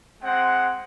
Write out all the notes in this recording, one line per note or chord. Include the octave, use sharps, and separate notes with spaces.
G#3 C4 F#5